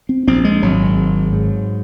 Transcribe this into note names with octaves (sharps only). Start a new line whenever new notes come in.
C4
A#1 C4
G#3
G#1 F#3
G#2
G#2